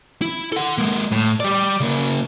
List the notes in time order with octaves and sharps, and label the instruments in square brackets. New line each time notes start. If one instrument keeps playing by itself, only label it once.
[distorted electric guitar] E4
A4 F#5
G#3 A#3
A2
G3 D5
C#3 A#3